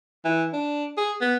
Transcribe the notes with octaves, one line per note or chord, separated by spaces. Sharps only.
E3
D4
G#4
B3